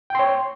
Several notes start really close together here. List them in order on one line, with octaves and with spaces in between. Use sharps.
G5 C6 C#5